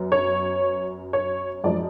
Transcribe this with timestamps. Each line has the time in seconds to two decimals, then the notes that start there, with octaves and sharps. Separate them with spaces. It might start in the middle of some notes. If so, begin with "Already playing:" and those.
Already playing: F#2 B3
0.12 C#5
1.13 C#5
1.64 F#2 F3 G#3 D5